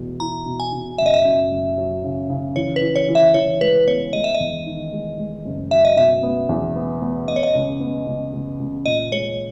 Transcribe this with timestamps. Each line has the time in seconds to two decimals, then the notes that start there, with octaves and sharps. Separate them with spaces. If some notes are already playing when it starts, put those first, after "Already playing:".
Already playing: E2 B2
0.20 E4 A#5
0.46 B2
0.60 G#5
0.72 B2
0.98 F#1 E5
1.06 D#5
1.14 E5
1.25 F#2
1.51 F#1
1.77 F#3
2.03 C#3
2.30 C#3
2.56 E3 C#5
2.76 B4
2.82 E3
2.96 C#5
3.08 E3
3.15 E5
3.34 E3 C#5
3.60 G#3 B4
3.87 B3 C#5
4.13 G#3 D#5
4.24 E5
4.34 D#5
4.40 E2
4.65 D#3
4.92 G#3
5.18 G#3
5.45 F#1
5.71 F#3 E5
5.85 D#5
5.97 B2 E5
6.23 B3
6.49 E2
6.76 B3
7.02 B3
7.28 B3 D#5
7.36 C#5
7.43 D#5
7.55 C#2
7.80 B3
8.06 C#2
8.33 C#2
8.59 C#2
8.86 A#2 D#5
9.11 G#3 C#5